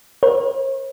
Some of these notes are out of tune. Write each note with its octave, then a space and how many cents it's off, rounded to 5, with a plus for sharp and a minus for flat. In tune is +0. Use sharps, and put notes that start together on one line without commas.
A#4 +40 C#5 -45